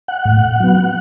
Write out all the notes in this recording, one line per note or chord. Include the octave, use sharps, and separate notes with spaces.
F#5
A2
F#3 B3